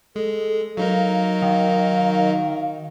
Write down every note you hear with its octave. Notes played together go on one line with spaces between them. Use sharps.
G#3 A4
F#3 D#4 A#4 F5
D#3 F5